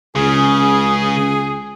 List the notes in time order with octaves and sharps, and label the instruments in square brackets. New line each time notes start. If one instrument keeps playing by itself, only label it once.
[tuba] C#2 [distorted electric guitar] C#3 [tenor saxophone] G#4